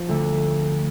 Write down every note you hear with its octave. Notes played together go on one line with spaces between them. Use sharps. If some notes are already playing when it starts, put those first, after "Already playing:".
Already playing: F3
D2 D3 A3